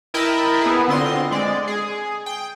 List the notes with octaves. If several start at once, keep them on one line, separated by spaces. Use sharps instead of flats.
E4 A#4 D#5 G5 A5 B5
B3 E4 G#4
D3 C4 F4 D#5 C6
G#3 D5
G#4
G5